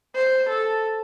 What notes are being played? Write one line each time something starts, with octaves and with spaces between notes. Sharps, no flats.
C5
A4